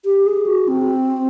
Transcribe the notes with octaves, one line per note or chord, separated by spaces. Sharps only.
G4
G#4
F#4
C4